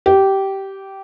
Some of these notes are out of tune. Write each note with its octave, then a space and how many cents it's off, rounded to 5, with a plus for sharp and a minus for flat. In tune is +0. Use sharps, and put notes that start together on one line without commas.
G4 -15